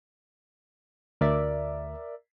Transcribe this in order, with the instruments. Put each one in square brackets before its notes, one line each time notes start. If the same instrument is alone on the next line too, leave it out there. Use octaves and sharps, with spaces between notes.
[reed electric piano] D2 [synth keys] A#4 D5 E5